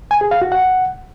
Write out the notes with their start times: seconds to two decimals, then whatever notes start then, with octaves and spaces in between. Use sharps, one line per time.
0.11 G#5
0.21 G#4
0.31 F5
0.42 F#4
0.52 F#5